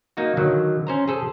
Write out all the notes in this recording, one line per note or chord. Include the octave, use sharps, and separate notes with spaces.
A#3 D#4 F#4
D3 D#3 F#3
C#4 C5 A#5
G#4 A4 C5